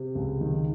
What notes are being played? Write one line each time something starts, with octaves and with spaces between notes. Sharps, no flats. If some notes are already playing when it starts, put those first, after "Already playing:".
Already playing: C3
C#2
D#3